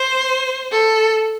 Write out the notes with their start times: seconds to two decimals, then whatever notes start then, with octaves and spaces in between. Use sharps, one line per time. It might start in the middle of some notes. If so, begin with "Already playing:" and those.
Already playing: C5
0.72 A4